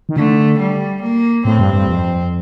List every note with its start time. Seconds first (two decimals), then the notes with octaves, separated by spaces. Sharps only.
0.09 D#3
0.16 D3 A3
0.59 G3
1.02 A#3
1.45 A2 C4
1.59 G2
1.74 G2
1.88 F2